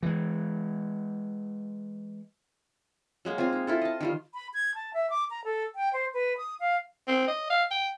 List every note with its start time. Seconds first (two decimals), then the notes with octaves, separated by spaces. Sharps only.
0.03 E3 G#3
3.25 F#3 G#3 A#3
3.38 C4 F4 F5 G#5
3.53 D#4
3.67 E4 F4 A4
3.82 D#5 A5
4.01 D#3 G3 F4
4.34 B5
4.54 G#6
4.75 A5
4.94 E5
5.10 D6
5.31 A#5
5.45 A4
5.75 G5
5.93 C5
6.14 B4
6.38 D#6
6.60 F5
7.08 C4
7.28 D#5
7.50 F5
7.71 G5